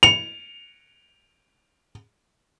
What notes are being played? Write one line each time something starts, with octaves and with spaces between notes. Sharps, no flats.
C#7 F7